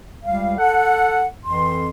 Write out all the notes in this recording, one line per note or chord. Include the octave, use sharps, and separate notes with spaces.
C#2 G3 F5
A4 F#5
F2 E3 C6